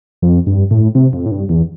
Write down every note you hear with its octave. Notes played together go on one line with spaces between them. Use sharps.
F2
G2
A2
C3
F2
A2
G2
E2